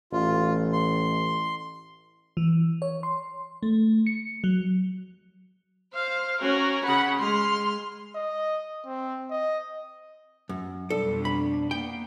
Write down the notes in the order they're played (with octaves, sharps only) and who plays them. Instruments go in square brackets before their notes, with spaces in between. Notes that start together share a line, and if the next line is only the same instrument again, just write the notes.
[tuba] A1 [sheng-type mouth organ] F4
[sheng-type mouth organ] C6
[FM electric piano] E3
C#5
C6
A3
C#7
F#3
[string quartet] C5 F5
[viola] C#4 [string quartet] F#4 A#4
[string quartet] C#3 F#5 [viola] B5
[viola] G#3 [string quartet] C6 F6
[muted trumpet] D#5
C4
D#5
[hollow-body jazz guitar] F#2
[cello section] F2 B2 G3 [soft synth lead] D4 [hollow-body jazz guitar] A4
[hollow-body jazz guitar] B5
[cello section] A#3 B3 [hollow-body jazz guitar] G5